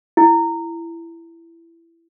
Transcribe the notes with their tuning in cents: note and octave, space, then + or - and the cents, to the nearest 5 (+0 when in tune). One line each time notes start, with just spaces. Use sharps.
E4 +15